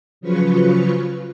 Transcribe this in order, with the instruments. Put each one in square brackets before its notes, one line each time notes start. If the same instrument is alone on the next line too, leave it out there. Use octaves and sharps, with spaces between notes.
[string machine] C#3 F3 F#3 F4 B4 C#6